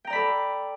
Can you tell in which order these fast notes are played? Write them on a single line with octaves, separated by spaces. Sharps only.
G5 A#5 D5 B5 A4